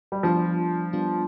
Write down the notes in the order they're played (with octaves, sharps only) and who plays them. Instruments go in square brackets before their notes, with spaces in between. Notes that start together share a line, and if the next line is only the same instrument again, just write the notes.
[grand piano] G3
[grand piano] F3 [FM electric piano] G3 B3 D4 F4
[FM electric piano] G3 B3 D4 F4